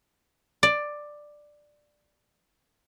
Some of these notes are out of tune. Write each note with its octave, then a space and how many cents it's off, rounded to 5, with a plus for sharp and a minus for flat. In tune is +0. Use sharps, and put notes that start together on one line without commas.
D5 +10